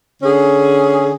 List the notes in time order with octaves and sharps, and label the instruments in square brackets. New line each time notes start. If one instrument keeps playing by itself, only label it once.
[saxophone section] D3 C#4 G#4